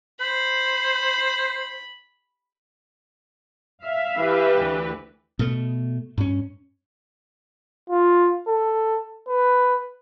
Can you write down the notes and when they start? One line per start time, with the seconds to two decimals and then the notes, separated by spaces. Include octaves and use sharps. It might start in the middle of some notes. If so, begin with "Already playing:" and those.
0.20 C5 B5
3.83 E5 F5
4.18 E3 G4 B4
4.59 D2
5.39 B2 A3
6.18 G2 C#4
7.90 F4
8.47 A4
9.28 B4